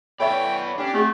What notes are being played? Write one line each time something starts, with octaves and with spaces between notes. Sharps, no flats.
B3 A4 C#5 D5 E5 G5 B5
C#4 D4 G4
A3 C4 F#4 G#4